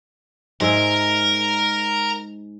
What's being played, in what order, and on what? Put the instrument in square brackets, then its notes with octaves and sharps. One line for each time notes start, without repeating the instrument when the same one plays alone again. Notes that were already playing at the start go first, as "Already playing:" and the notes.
[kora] G#2 G#3 E5 [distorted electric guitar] A#4